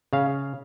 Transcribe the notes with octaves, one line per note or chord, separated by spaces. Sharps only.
C#3 F5